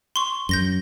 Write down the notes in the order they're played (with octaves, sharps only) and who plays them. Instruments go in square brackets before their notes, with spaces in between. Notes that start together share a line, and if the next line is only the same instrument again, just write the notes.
[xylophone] C6 C#6
[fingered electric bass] F#2 [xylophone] G6 A#6 G7